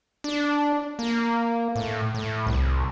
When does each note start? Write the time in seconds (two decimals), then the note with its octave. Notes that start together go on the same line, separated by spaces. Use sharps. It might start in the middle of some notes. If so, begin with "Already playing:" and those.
0.24 D4
0.99 A#3
1.76 A2
2.14 A2
2.46 C2